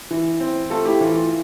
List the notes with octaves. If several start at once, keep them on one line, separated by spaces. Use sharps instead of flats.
E3
C4
A3 F4 A4
E4 G4
E3 F4
F4